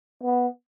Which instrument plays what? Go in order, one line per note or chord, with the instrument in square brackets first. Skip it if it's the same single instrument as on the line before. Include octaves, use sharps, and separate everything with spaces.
[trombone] B3